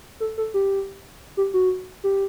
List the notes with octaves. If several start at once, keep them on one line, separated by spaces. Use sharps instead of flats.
A4
A4
G4
G4
F#4
G4